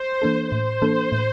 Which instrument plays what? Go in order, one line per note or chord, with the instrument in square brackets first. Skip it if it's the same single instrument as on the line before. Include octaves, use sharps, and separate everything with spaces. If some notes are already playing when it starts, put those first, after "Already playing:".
Already playing: [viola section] C5
[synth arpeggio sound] E3 A#3 D4 A4
[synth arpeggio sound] A2 [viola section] C5
[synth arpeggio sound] E3 A#3 D4 A4
A2